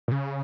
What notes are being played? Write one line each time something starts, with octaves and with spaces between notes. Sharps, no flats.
A#2
C#3